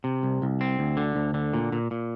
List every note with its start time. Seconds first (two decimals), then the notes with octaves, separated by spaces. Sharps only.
0.04 C3
0.23 C2
0.42 C2
0.61 C4
0.79 D2
0.97 D3
1.16 D2
1.34 D3
1.54 A#2
1.72 A#2
1.91 A#2